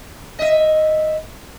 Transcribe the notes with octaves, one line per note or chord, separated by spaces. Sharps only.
D#5 E5